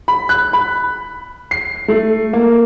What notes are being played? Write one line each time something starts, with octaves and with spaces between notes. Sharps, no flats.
B5
F#6
B5
C7
A3
A#3